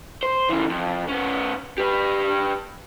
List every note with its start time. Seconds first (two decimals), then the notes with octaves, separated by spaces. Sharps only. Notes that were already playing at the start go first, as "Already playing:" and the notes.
0.23 C5
0.50 C#3 E3
0.70 F2
1.08 B3 C#4
1.78 G4 B4